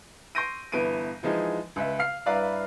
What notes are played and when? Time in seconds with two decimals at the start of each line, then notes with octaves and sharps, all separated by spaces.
0.35 C6 C#6 G6 A#6 D7 D#7
0.72 G1 E3 B3 D7 D#7
1.23 E3 F3 G#3 D#4
1.76 C#2 B4 E5
1.99 F5 F6 C7
2.26 G2 E4 B4 D5 F5 A#5